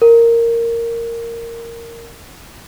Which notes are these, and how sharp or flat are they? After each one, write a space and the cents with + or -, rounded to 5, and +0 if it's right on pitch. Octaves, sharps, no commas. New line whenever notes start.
A#4 -10